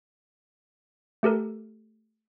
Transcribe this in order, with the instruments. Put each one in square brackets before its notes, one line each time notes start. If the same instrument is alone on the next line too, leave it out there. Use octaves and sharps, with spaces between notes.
[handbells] A3 G4 A4 A#4